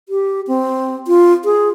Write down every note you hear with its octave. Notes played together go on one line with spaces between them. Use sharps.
G4
C4
F4
G#4